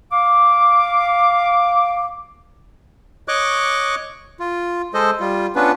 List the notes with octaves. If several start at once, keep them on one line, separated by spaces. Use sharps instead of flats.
F5 D6
C#5 D#5 C#6 D6 F#6
F4
G#3 A4 C5 D#5
G3 F4
B3 C#4 D4 F4 B4